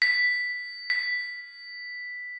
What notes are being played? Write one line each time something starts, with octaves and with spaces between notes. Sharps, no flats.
B6
B6